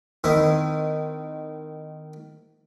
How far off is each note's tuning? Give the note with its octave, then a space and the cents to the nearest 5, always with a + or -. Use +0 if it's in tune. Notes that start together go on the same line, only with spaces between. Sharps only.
D#3 -10 C4 -45 E4 +0